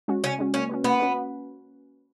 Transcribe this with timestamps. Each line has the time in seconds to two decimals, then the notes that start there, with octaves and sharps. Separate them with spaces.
0.08 G#3 C#4 F#4
0.23 C#3 C#4
0.39 G#3 C#4 F#4
0.54 A#3 C#4
0.69 C#4 F#4 B4
0.84 A#3 B3
1.00 C#4 F#4 B4